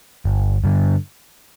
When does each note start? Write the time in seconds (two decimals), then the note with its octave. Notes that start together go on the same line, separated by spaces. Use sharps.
0.25 G1
0.64 G2 D3